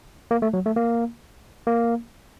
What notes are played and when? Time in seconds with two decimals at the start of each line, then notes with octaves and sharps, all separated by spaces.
0.31 A#3
0.42 A3
0.53 F#3
0.66 A3
0.76 A#3
1.67 A#3